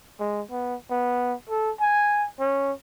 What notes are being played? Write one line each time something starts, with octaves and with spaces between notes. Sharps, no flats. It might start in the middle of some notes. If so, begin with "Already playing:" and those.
G#3
B3
B3
A4
G#5
C#4